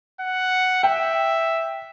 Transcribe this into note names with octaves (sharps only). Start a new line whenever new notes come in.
F#5
E5 G5